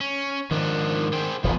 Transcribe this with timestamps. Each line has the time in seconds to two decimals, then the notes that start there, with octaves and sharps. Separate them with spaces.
0.01 C#4
0.51 G#2 D#3 F3 D4
1.13 G#4 C5 G5
1.44 E1 A1 F3 B3